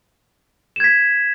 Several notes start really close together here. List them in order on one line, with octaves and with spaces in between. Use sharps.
E7 G#6 B6